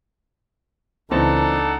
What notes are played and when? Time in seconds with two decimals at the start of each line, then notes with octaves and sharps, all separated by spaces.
1.11 C#2 C#3 E3 C4 D4 D#4 A4 F#5